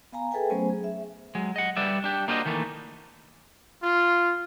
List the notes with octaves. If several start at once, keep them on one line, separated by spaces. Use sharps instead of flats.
B3 F5 G#5 A#5
G#4 A4 B4 E5 G5 G#5
F#3 A3 B3 C#4 C5 G#5
G#4
E5
F#3 G#3
D#5 F#5
G3 B4 D5 E5
D4 G4
A#3 D4 F4 F#4 C5 D#5
D#3 E3 A3 A#3
F4